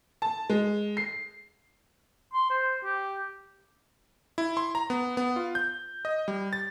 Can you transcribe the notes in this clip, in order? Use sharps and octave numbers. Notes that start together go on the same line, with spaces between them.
A5
G#3
C7
C6
C5
G4
E4
C6
A#5
B3
B3
F4
G6
D#5
G3
A6